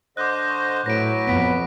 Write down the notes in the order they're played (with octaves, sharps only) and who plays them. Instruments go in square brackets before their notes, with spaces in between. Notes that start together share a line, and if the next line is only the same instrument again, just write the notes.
[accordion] D3 C5 D#5 [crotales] D6 F#6
[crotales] C#6
[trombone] A2 [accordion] F#3 B4 [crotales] A#6 D7
[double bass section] F2 [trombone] B3 [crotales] A#6 B6 D7